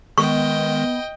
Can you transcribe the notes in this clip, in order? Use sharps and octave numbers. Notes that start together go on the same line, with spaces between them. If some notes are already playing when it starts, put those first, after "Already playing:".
D#3 G#3 B3 D#5 G5 C#6